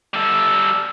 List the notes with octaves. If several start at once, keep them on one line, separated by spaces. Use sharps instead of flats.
G3 A4